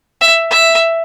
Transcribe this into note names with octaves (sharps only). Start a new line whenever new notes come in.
E5
E5